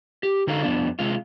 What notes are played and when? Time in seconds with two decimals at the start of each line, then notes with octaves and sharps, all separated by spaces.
0.23 G4
0.47 D3 D#4 F#4 A4 F5
0.63 F2 B3 D4
0.99 C3 G#3 F4